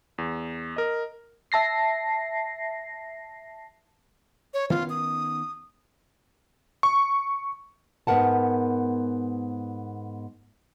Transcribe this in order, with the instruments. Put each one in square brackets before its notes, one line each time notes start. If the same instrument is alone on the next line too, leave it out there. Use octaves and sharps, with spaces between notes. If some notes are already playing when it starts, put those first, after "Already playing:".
[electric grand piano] E2
A#4 D#5
[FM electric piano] E5 A5 A#6 C7
[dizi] C#5
[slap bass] D#3 B3 C#4 [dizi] F4
[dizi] D#6
[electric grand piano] C#6
[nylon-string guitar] G#2 B3 A#4 F#5 A5